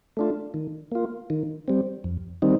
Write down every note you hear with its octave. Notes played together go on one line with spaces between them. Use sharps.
A3 D4 F4
D#3
A#3 F4
D#3
G3 C4
F2
D#3 G3 C4 D#4